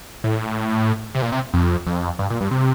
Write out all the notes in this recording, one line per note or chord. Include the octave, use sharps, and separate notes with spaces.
A2
C3
A#2
C3
F2
F2
G2
A#2
G2
C3